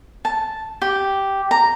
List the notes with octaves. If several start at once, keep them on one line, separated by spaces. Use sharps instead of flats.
A5
G4
A#5